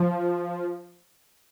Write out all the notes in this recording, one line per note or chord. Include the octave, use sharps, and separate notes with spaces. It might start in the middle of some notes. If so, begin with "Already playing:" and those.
Already playing: F3